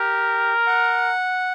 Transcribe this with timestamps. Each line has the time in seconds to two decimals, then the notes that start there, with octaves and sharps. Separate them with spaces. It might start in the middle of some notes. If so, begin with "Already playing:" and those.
Already playing: G4 A#4
0.67 F#5